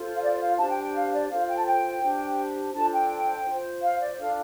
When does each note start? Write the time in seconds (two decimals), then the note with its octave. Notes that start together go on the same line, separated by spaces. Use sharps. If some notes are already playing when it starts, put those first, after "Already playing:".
Already playing: F4 A4 C5
0.15 F5
0.22 D5
0.41 F5
0.58 D4 G4 C5 A5
0.70 G5
0.83 G5
0.94 F5
1.13 D5
1.30 F4 A4 C5 F5
1.49 G5
1.57 A5
1.66 G5
2.02 D4 G4 C5
2.74 D4 F4 A4 C5 A5
2.93 G5
3.46 F4
3.51 C5
3.82 F5
4.00 D5
4.19 D4 F4 A4 F5